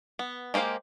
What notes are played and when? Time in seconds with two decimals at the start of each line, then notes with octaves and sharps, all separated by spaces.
0.19 B3
0.54 G#3 A#3 G4 C5 F5